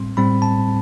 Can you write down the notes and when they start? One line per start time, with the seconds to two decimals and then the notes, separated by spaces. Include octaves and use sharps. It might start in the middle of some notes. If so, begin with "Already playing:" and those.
Already playing: A2 G3 C4 C6
0.17 A2 G3 C4 B5
0.42 A5